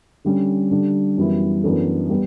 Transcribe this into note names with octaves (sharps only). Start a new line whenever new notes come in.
D3 G3 C#4
D3 G3 D4
F#2 E3 G3 B3 E4
F#2 E3 B3 D4 A4
G3 B3